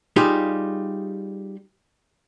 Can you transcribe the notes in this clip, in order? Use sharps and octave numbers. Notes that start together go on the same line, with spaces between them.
G3 D#4 F4 G4 G#4